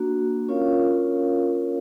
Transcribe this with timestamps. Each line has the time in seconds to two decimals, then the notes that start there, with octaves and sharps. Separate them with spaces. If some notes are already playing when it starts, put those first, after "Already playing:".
Already playing: A#3 D4 F#4
0.48 C#4 F4 A#4 C#5 F5